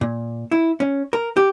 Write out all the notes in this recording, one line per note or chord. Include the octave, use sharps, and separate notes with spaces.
A#2
E4
C#4
A#4
G4